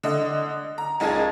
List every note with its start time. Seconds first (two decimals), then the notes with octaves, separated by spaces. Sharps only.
0.03 D3 D#5
0.78 A#5
1.00 F#1 C#2 D#4 G#4 A5 G#6